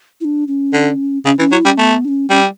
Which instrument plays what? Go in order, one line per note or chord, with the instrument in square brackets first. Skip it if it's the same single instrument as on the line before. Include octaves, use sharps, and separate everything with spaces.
[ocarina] E4
D4
C#4
[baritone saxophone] D3
[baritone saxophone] C#3 [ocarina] C#4
[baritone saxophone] E3 [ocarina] C#4
[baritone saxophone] F#3 [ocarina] E4
[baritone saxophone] G3 [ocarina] C#4
[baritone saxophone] A3 [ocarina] B3
[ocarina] D4
C#4
[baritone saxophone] G3 [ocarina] C#4